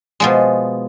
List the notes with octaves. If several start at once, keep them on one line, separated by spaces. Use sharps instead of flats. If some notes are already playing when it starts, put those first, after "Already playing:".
B2 F3 G#3